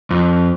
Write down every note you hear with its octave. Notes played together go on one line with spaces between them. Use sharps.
F2